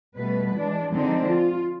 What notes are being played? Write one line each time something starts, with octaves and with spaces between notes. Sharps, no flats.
B2 G3 A3 B4
E3 G#3 D4
D3 F3 G#3 C4 D4 D#4
F4